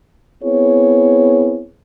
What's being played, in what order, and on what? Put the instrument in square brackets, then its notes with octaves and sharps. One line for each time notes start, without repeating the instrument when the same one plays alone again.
[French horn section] B3 C4 E4 G#4 C#5